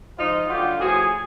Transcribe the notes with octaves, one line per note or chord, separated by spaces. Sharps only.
G#2 F3 D#4 F4
G2 D3 F#3 F4 G4
A2 F3 F#4 G#4